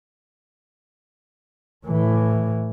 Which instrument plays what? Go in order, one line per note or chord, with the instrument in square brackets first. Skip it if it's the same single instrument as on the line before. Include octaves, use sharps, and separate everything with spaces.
[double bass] A2 E3